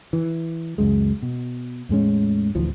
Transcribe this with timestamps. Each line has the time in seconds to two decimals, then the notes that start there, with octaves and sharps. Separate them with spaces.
0.13 E3
0.78 C#2 F#2 G#3
1.22 B2
1.89 E2 A2 G#3 C#4
2.55 A1 D2 E3 F3